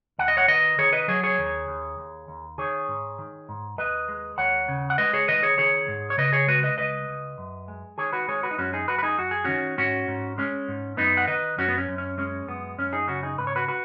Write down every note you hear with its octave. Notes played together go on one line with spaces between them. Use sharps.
D#2 F#5
D#5
C#5 F#5
D#3 B4 D#5
D#3 G#4 C#5
B4 D#5
F#3 G#4 C#5
G#4 C#5
D#2
D#2
D#2
D#2
D#3 G#4 C#5
G#2
D#3
G#2
D#2 B4 D#5
G#3
D#2 C#5 F#5
C#3
F#5
G#3 B4 D#5
G#4 C#5
D#3 B4 D#5
G#4 C#5
D#3 G#4 C#5
G#2
C#5
C#3 B4 D#5
G#4 C#5
G#3 F#4 B4
B4 D#5
C#2 B4 D#5
C#2
F#2
G#3
D#3 G#4 C#5
F#4 B4
G#3 G#4 C#5
F#4 B4
D#4
F#2 C#4 F#4
D#4 G#4
F#2 F#4 B4
B4
D#4 G#4
F#2 F#4
G#4
D#3 C#4 F#4
G#2 C#4 F#4
G#2
G#3 C#4
G#2
F#2 B3 D#4
F#5
D#3 B4 D#5
F#2 C#4 F#4
B3
C#4
F#2
C#4
G#3 C#4
F#2 B3
F#2 C#4
D#4 G#4
C#3 C#4 F#4
D#4 G#4
G#2 B4
C#5
F#4 B4
F#4 B4